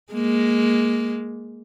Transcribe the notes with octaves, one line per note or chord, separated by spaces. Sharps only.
G#3 A#3